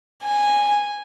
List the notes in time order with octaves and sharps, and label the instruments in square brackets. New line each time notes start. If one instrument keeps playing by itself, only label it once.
[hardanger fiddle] G#5